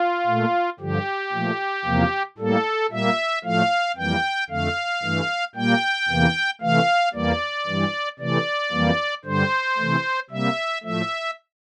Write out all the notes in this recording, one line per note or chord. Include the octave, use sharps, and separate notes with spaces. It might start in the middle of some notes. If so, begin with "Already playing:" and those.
Already playing: F4
A#2 A3
G2 D3 F3 G4
A#2 F3 A3
E2 C3 F3 A#3
A2 G3 A#3 A4
A#2 G3 A#3 E5
A2 F3 A3 F5
F2 E3 G3 A#3 G5
F2 D3 A3 F5
G2 E3 A3
A#2 G3 A#3 G5
E2 C3 E3 A#3
C3 E3 A3 F5
E2 E3 G3 A#3 D5
G2 E3 G3
C3 E3 A3 D5
F2 E3 G3 A#3
G2 D3 G3 C5
C3 E3 A3
C3 G3 A#3 E5
A2 F3 A3 E5